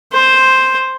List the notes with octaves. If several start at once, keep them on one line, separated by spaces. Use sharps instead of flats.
C5